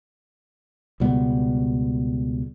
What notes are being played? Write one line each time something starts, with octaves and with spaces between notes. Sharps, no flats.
C#2 B2 G3 B3